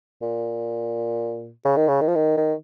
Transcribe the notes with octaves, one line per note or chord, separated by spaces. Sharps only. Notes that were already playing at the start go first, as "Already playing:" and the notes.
A#2
C#3
D#3
C#3
D#3
F3
D#3
D#3